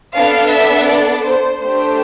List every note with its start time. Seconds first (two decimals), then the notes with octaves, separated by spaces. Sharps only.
0.15 B3 D4 A4 F5
0.51 E5
0.88 D5
1.24 C5
1.61 A3 D4 G4 C5